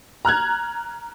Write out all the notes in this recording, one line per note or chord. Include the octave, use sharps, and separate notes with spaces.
A#5 F6 F#6 G#6